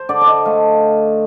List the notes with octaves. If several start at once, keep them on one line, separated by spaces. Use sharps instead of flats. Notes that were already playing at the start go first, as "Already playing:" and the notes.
Already playing: C5
D3 D5
D5
D#5
A3 F5